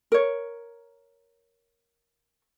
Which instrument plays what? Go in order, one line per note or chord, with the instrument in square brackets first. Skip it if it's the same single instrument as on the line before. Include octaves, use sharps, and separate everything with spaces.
[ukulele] A#4 C#5